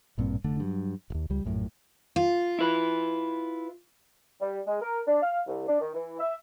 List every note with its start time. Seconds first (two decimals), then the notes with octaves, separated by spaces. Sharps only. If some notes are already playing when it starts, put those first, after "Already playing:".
0.18 A1 G2 A#2 C4
0.44 F1 D3 A3 D4
0.60 G2 F#3
1.10 D1 D#2
1.30 C#2 G3
1.45 A#1 F#2 A2
2.16 F4
2.59 E4 B4
4.40 G3
4.67 G#3
4.81 A#4
5.07 D4
5.22 F5
5.47 C2
5.67 D4
5.80 D#3
5.93 E3
6.19 E5